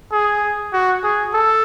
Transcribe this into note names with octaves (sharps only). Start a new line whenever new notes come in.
G#4
F#4
G#4
A4